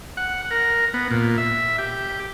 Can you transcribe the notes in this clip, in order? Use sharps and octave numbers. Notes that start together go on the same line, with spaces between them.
F#5
A#4
B3
A#2
E5
G4